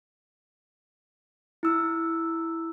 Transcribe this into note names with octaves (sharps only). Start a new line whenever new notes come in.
E4 E6